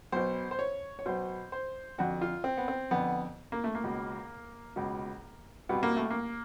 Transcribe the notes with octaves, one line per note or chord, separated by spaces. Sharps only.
B1 B2 C5
C5
C#5
C#5
B1 B2 C5
C5
F2 D3 F#4
F4
C4
B3
C4
F2 D3 B3
A#3
A3
A#3
C#2 B2
C#2 B2
C2 B2 B3
A#3
A3
A#3